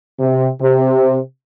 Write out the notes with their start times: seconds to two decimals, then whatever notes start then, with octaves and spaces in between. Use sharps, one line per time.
0.20 C3
0.61 C3